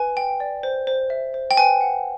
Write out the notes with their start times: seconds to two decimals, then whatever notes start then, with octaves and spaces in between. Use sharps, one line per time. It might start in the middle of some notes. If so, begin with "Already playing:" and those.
Already playing: B4 G#5
0.17 G5
0.40 D5
0.63 C5
0.87 C5
1.10 E5
1.34 C5
1.51 G5
1.57 B4 G#5
1.81 F#5